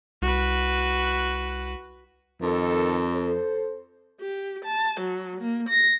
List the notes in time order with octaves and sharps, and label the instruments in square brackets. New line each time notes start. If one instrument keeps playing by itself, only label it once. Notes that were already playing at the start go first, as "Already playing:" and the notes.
[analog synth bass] C2 [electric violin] F#4 B4
[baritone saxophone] F2 [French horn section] D#3 A4
[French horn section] A4 C5
[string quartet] G4
A5
F#3
A#3
A#6